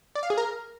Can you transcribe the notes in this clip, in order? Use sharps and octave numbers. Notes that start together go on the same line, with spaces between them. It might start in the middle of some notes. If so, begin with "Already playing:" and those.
D5
F5
G#4
A#4